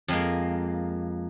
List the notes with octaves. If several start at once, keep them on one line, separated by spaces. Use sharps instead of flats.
F2 G#3 A#3